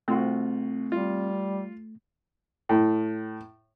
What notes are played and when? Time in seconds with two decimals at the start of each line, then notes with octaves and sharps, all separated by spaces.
0.08 C2 A3 C4 F4 F#4
0.92 G3 F4
2.69 A2